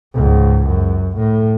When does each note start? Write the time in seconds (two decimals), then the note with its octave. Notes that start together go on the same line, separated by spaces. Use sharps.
0.14 C#2 G#2
0.66 F#2
1.16 A2